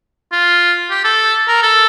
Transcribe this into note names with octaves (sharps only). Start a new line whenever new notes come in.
F4
G4
A4
A#4
A4